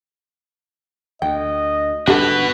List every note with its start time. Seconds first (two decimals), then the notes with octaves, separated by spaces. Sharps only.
1.22 D2 D#5 G5
2.07 G1 G#2 B3 D4 F#4 G4 A4